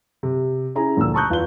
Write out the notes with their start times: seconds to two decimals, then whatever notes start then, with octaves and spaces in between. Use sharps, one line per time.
0.23 C3
0.75 C#4 E4 G#4 A#5
0.96 D2 A#2 D3 F3 A3 E6
1.14 A5 A#5 C#6 D#6 F#6 G6
1.30 E2 F4 B4 G7